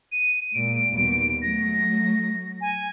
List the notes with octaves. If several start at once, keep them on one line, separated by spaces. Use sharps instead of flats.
D#7
A#2 G#3 D7
D#2 B2 G3
F#3 A3 A#6
G#5